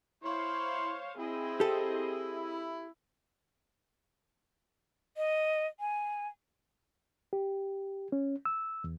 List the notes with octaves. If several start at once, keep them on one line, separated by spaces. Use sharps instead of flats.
E4 C5 C#5 F5 C6
C4 E4 G#4 D#5
G4 A4
D#5
G#5
G4
C#4
E6
E2